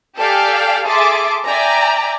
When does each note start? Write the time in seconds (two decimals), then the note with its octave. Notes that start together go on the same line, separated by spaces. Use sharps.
0.17 G4 A4 D5 F5 G5 G#5
0.86 G#4 A4 E5 C6 D6 A6
1.44 D5 E5 G5 G#5 A#5